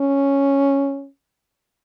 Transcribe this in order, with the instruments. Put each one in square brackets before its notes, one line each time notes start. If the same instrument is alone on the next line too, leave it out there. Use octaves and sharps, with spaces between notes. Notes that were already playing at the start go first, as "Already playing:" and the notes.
Already playing: [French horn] C#4